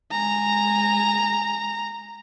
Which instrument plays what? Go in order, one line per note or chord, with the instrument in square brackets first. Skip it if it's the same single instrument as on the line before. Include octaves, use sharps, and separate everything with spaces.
[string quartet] G#3 G#5 [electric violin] A#5